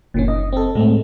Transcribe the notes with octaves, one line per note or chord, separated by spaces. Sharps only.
F#1 A#2 D#3 C#4
D#5
C4 A4
A2 G#3 A3 C4